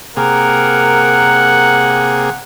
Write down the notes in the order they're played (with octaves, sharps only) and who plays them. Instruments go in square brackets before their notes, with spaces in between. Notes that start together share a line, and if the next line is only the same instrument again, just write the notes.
[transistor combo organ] C3 A#3 G#4 [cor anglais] A#4 [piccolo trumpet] F#5